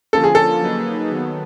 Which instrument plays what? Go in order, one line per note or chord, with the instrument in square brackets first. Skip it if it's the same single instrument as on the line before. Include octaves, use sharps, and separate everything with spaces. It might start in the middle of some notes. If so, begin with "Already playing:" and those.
[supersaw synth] D3 F3 A#3 C#4 F4 [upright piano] A4
[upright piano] G#4
A4
[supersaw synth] F#3 A#3 D#4 G#4 B4
D#3 F#3 B3